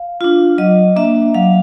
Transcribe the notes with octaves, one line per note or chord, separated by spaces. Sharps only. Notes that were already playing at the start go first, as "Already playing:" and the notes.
Already playing: F5
D4 F4
F#3 D#5
A#3 D4 E5
F#3 F5